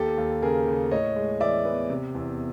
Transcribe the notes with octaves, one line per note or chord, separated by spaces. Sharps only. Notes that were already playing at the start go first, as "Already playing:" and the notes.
Already playing: D#2 G4 A4
D#2
C#3 G#4 A#4
C#3
A2 C#5 D#5
G#3
E3 D5 E5
B3
C3
E2